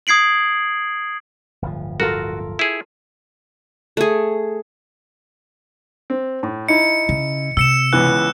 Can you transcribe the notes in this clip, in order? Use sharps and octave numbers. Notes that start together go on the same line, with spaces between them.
D#6 G#6 C7 D7 F#7
D1 G1 F3
F4 F#4 A4 A#4
E4 G#4
A3 G#4
C4
A2
D#4 E4 C#7
C#3
C3 E6 C#7 E7
C#2 E3 B3 F#6